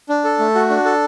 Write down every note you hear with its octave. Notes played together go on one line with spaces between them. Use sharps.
D4
A4
A3
F#4
D4
A4